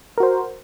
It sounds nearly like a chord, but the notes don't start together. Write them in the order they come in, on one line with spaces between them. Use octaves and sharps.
A#4 F#4 C5